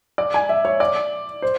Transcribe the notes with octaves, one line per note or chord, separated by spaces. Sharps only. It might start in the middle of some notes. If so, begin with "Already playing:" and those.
D5
G#5
E5
C#5
D5
C5